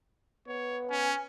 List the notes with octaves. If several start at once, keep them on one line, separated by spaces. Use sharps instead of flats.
B3 C#5
C#4 G#5